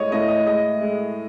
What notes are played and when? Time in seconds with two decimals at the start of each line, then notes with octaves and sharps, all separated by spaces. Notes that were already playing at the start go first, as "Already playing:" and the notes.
Already playing: A2 G#3 C#5 D#5
0.12 A2 D#5
0.28 D#5
0.45 G#3 D#5
0.81 G#3